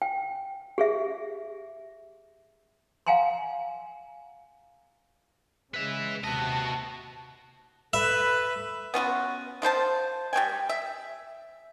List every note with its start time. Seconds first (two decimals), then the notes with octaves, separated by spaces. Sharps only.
0.02 G5
0.78 G4 G#4 E5
3.07 F5 F#5 G#5 A#5 C6
5.74 C#3 G#3 B4 E5
6.24 D#2 C3 F#4 D#5 A5
7.93 A4 B4 E5
8.94 B3 C#4 F4 F#4
9.62 F3 F4 C5 A5
10.33 G3 C#4 G5 G#5
10.69 E5